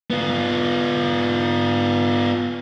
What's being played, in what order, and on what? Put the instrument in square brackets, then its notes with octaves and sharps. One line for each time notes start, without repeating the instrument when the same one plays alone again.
[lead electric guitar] B3 F4